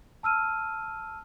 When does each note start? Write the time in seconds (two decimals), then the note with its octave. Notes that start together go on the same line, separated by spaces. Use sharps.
0.23 A5 E6 F6 D#7